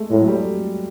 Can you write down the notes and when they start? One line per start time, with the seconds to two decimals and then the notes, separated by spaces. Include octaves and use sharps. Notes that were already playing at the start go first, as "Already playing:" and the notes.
Already playing: G#3 A3
0.10 A2 G#3
0.22 F#3
0.28 G3